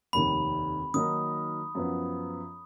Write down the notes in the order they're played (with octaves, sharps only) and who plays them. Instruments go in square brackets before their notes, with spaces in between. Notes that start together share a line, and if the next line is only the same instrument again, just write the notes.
[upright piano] F1 D#2 D#3 [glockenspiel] B5
[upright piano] D#3 F#3 A#3 D#4 A#4 [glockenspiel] D#6
[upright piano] F#2 F3 B3